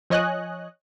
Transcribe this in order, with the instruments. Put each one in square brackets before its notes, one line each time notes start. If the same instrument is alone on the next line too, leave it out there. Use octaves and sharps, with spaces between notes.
[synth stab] F3 C#5 D#5 G#5 F#6